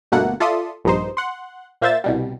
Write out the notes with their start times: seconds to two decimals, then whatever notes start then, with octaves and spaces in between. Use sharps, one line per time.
0.12 G1 B2 A3 A#3 F#5
0.40 F4 A4 D5 E5 C6 D#6
0.85 A#1 G2 D#4 C5
1.17 F#5 C6
1.81 A#2 A#3 C5 E5 A6 E7
2.04 C2 B2 G3